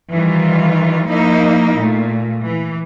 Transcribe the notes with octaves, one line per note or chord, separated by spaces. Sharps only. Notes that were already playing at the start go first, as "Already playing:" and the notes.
D#3 E3 G3 F4
F3 A#3 D#4 E4
A#2 A3
E3